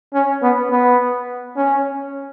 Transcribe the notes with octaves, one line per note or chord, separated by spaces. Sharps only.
C#4
B3
B3
C#4